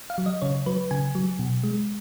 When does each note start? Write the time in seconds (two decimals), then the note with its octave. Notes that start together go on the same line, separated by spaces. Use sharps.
0.10 F5
0.18 F#3
0.26 D#5
0.42 C#3 C#5
0.66 F#3 B4
0.91 C#3 G#5
1.15 F#3
1.39 B2
1.63 G#3